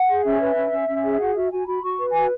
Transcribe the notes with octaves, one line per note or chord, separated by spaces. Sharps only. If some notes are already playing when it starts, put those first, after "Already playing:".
Already playing: F#5
G#4
C#4 E5
B4
C#4
C#4
C#4
G#4
F#4 F#5
F#4 E5
F#4 G#5
F#4 B5
F#4 C#6
B4
F#4 G#5